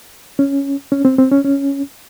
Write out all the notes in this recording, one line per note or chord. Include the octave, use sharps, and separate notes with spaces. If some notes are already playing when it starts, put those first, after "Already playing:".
C#4
C#4
C4
C4
C#4
C#4